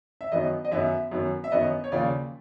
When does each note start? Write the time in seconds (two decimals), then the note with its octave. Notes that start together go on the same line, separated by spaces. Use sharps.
0.21 E5
0.32 F#2 D#3 F#3 B3 D#5
0.65 D#5
0.72 F#2 D#3 F#3 B3 E5
1.11 F#2 D#3 F#3 B3
1.44 E5
1.52 F#2 D#3 F#3 B3 D#5
1.84 C#5
1.92 D#2 C#3 F3 A#3 D5